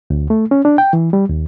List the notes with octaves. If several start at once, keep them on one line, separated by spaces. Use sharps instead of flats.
D2
A3
C#4
D4
G5
E3
G3
D#2